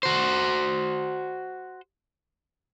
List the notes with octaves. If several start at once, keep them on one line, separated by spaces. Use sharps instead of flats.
F#4 C5